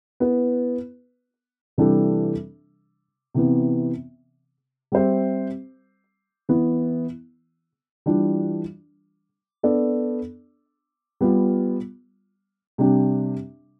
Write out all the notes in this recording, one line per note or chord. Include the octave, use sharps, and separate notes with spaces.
B3 E4 B4
C3 E3 G3 D4 A4
C3 E3 B3
G3 C4 G4 C5 E5
E3 B3 E4
E3 G3 D4 F4
B3 D4 A4 D5
G3 B3 F4
C3 G3 D4 G4